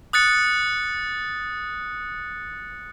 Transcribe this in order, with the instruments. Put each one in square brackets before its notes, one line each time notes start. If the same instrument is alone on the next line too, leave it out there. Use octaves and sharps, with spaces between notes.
[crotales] D#6 F#6 A6 C#7